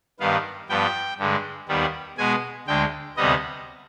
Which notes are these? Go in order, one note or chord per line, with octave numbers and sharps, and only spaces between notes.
G2 D#3 B3 F5
G2 F3 B3 G5
G2 D3 G#3
D#2 D#3 G3 B3
B2 G#3 B3 G#5
D2 D3 G#3 G5
D2 C3 G3 B3 D#5